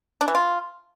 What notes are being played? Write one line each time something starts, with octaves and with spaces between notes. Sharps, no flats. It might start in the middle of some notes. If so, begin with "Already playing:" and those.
D4
E3
F4